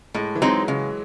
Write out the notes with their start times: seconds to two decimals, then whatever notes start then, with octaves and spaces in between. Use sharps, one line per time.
0.15 A2 G#3
0.35 E3
0.42 F#3 G#3 C4 D#4
0.68 C#3 G#3